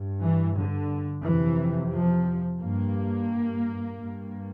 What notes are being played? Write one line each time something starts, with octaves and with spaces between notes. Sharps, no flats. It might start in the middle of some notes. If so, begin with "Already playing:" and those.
Already playing: G2
E3
D3
F2 C3 E3
F3
G2 A#3
G2